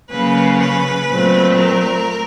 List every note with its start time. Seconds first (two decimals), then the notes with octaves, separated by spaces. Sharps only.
0.10 C#3 F#3 A#3 C#4 B4
0.59 B4
1.08 A#2 F#3 A3 C4
1.57 A#4